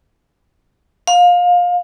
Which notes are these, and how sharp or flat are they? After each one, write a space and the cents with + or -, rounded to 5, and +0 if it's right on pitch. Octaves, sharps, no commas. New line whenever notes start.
F5 +25